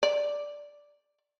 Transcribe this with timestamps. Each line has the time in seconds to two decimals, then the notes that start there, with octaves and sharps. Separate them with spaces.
0.03 D5